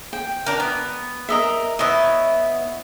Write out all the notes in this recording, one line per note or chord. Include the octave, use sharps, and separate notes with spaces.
G5
D4 A#4
B3
A#4 D#5 E5
B3 E4 C#5 D#5 E5